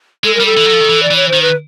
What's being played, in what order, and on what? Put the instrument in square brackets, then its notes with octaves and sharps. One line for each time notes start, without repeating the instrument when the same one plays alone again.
[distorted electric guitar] G#3 [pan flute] A4
[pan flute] A#4
[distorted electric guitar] G3
[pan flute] A4
[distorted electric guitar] E3
F#3
F3
D#3
E3
[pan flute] D5
[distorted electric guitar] E3 [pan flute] C#5
[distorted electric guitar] D#3 [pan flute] C5
[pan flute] B4